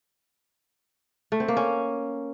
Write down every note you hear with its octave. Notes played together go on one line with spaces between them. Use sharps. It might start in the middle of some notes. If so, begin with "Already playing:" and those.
A3
C4
A#3
C#4